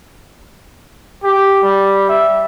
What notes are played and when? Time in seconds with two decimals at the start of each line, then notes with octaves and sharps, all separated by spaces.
1.22 G4
1.62 G3
2.08 E5